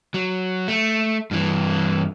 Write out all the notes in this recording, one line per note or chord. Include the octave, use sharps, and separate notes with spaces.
F#3
A3
G2 E3